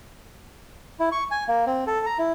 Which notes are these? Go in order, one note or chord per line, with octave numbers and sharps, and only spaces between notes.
E4
C#6
G#5
A#3
C4
A4
A#5
E4